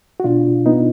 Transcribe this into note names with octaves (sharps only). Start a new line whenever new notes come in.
F#4
B2 D4 F4
B3 D#4